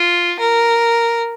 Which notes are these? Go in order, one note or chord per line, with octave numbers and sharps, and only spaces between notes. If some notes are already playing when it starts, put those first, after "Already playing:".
Already playing: F4
A#4